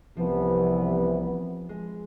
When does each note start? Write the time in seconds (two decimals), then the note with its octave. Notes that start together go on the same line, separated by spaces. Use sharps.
0.17 C2 C3 E3 F3 B3
1.69 G#3